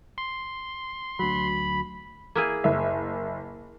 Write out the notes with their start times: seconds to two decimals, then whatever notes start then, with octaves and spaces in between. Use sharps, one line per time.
0.18 C6
1.19 D2 F#3 B5
2.35 A#3 E4 G#4
2.64 F#1 E5